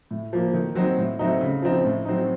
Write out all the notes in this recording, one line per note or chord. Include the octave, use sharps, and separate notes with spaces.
A2
F3 A#3
D#3
F#3 C4 D#4
A2
F#3 A3 C4 D#4
C#3
F3 C4 D#4
A2
F#3 C4 D#4